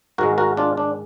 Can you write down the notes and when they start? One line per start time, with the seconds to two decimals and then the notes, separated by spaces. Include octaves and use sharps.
0.18 G#2 D#3 G#3 F#4 A#4
0.38 F#4 A#4
0.57 D4 F4
0.77 D4